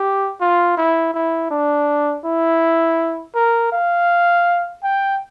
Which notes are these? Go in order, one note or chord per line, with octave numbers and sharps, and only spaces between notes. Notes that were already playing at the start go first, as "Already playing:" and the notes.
Already playing: G4
F4
E4
E4
D4
E4
A#4
F5
G5